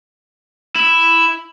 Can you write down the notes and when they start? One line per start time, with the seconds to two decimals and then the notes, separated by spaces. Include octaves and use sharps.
0.75 E4